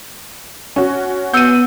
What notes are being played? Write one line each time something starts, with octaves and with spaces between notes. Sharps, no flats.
C#4 F#4
B3 F#5 E6 G6 C#7 D#7